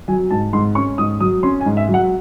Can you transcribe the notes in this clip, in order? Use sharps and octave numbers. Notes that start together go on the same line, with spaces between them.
F#3 G#5
G#2 A5
G#2 C6
C#4 C#6
G#2 D#6
F#3 D#6
C#4 C6
G#5
G#2
E5
F#3
F#5